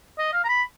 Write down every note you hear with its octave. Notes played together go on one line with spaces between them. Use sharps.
D#5
F5
A#5
B5